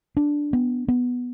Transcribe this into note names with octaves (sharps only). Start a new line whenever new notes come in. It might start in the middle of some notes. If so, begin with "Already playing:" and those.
D4
B3
B3